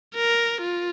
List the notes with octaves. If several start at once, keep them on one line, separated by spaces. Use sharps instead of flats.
A#4
F4